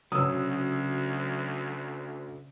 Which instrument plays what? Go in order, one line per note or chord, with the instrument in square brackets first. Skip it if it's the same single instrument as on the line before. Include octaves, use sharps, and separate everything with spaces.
[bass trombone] D2 [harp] C#3 [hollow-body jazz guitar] F#3 C#4 [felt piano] D#6 E6